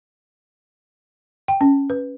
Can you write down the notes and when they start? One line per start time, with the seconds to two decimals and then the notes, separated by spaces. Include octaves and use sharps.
1.48 G5
1.61 C#4
1.90 B4